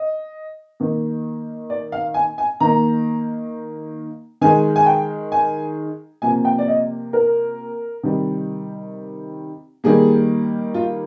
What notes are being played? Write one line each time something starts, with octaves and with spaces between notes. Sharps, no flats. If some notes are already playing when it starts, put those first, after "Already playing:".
Already playing: D#5
D#3 A#3
D5
F5
G#5
G#5
D#3 A#3 A#5
D#3 G#3 G#5
G#5
G5
G#5
C3 F3 A#3 G#5
G5
D5
D#5
A#4
C3 D#3 G3
D#3 G3 A#3 G#4
F4